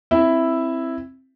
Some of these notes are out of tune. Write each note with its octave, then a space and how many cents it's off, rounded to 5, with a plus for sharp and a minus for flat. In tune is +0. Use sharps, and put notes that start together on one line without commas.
C4 +10 E4 +0 E5 +0